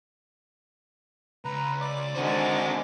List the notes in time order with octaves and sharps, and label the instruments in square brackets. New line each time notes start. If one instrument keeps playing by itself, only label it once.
[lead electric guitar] C#2 [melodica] B4 A#5
[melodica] D5 D6
[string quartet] D3 D#3 G#3 [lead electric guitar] C4 F#4